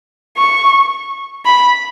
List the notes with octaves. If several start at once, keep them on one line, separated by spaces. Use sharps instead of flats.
C#6
B5